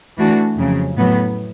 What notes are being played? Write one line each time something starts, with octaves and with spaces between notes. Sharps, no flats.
E3 A3 D4 F#4
F2 C#3 F#3
A2 F#3 B3